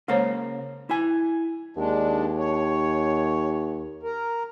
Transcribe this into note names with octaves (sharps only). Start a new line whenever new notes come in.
C#3 G#3 A#3 A#4 C5 C#5
E4 G#5
D#2 G#3 D4
C#5
A#4